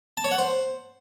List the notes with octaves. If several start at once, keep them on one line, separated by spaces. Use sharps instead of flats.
A5
C#5
F#5
C5